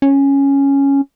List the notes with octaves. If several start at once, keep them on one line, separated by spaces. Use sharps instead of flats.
C#4